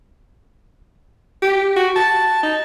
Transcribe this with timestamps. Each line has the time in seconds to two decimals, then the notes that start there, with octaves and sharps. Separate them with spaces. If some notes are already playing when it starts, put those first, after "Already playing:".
1.42 G4
1.76 F#4
1.96 A5
2.43 D#4